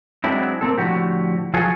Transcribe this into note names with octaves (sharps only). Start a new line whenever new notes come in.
F#3 G#3 C4 D4 E4
A#3 C4 A4
A2 D3 F3 F#4 G4
F3 F#3 F4 G#4 A4 C#5